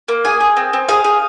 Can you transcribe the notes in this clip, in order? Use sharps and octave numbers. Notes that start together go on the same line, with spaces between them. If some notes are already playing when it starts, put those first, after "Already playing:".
A#3
G#4 G#5
G#4
C4
C4
G#4 F5
G#4